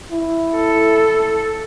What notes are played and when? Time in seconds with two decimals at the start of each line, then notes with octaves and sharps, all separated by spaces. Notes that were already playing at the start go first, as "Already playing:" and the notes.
0.12 E4
0.55 A4